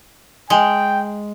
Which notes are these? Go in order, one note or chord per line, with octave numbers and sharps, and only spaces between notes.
G#3 G5